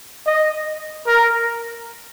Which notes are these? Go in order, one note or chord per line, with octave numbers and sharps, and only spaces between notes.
D#5
A#4